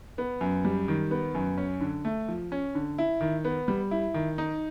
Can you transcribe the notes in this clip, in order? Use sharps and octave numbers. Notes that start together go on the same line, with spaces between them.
B3
F#2
G3
D#3
B3
F#2
C#4
D3
A3
F3
C#4
D3
E4
D#3
B3
G3
E4
D#3
D#4